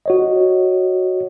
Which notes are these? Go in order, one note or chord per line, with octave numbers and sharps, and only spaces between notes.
F#4 C#5 D#5